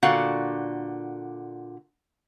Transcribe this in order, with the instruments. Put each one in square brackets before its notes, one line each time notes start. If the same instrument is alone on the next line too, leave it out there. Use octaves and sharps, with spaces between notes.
[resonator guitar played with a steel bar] A#2 D3 F#4 F5 F#5